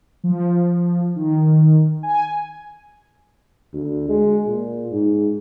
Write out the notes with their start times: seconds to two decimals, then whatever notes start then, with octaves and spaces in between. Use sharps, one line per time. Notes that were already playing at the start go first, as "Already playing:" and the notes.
0.24 F3
1.16 D#3
2.03 G#5
3.73 D2
4.09 G#3
4.47 A#2
4.92 G#2